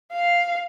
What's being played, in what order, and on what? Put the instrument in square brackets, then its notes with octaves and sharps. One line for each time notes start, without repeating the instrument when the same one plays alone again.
[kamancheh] F5